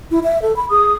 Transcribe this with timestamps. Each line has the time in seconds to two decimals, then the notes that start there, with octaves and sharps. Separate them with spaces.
0.11 E4
0.24 E5
0.42 A4
0.56 B5
0.70 G#4 D#6